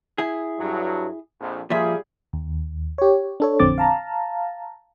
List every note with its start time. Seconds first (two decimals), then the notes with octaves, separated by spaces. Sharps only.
0.18 E4 G#4
0.58 G2 F#3
1.39 A#1 F2
1.70 A#2 F3 G3 F4 G#4 E5
2.33 D#2
2.98 G4 C#5
3.40 D4 A4 C#5
3.59 A1 F2 D3 C4 D6 A6
3.78 F5 A5 A#5